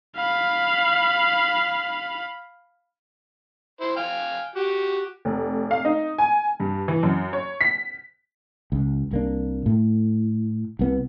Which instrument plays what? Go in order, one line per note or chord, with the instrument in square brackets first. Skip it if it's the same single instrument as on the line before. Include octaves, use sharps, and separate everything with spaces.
[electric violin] F5 B5
[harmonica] E4 C5
F5 G5 G#5
F#4 G4
[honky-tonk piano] F1
F5
D#4
G#5
G2
E3
F#2
C#5
B6
[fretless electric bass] C#2
C2 A#3 D4
A2
C2 B3